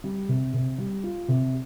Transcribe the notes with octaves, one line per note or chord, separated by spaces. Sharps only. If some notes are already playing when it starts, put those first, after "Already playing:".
G3
C3
C3
G3
F4
C3